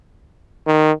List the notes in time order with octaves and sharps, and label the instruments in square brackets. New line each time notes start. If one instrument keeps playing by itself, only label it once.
[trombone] D#3